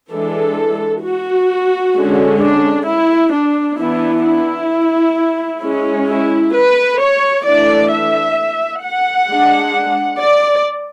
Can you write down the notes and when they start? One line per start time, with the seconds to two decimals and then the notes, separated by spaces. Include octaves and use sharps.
0.11 E3 G#3 D4 A4
1.03 F#4
1.95 D3 G#3 C#4
2.40 D4
2.86 E4
3.32 D4
3.78 E3 B3 D4 E4
4.25 E4
5.62 G#3 C#4
6.07 E4
6.53 B4
6.99 C#5
7.44 E3 A3 D4 D5
7.90 E5
8.82 F#5
9.28 G#3 D4
10.19 D5